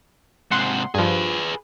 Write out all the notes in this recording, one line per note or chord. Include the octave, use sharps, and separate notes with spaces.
G#2 C3 F#5 C6
G2 F3 G#4 B4